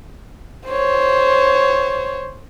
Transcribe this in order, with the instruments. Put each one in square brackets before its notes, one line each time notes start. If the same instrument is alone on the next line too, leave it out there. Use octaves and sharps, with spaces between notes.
[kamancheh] C5 C#5